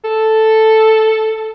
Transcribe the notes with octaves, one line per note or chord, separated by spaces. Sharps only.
A4